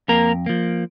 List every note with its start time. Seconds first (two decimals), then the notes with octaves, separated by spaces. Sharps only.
0.08 F2 A#3 A#4
0.46 F3 A#3